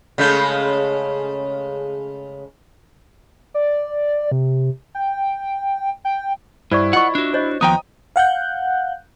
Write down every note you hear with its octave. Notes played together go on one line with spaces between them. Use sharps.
C#3 G#3 A3
D5
C3
G5
G5
G2 E4 C5 D5 C#6
F4 D#5 F#5 C#6
D4 F#4
C5 C#5 D#5
D#2 F3 B3 G5 A#5 D#6
F5 F#5 F#6 G6